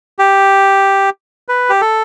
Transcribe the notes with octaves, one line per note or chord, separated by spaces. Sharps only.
G4
B4
G4
A4